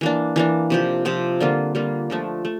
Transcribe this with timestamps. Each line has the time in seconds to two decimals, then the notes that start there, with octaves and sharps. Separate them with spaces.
0.01 E3 A#3 D4
0.36 E3 A#3 D4
0.70 C3 F3 C4 G4
1.05 C3 F3 C4 G4
1.40 D3 G3 A#3 F4
1.75 D3 G3 A#3 F4
2.10 D3 F3 A3
2.45 A3